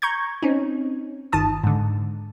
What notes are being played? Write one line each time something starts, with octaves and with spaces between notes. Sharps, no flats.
A#5 C#6 G6 G#6
C4 C#4 D#4
G1 D#3 A5 D#6
G#2 D3